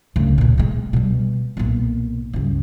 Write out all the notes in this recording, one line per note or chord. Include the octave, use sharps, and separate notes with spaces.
D2 C#3
D2 A#2
B2 G#3
B2 G3
B1 A#2
C#2 G2